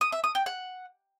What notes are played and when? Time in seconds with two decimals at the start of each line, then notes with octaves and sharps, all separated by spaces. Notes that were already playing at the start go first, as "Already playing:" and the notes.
0.01 D#6
0.12 E5
0.24 D#6
0.35 G5
0.46 F#5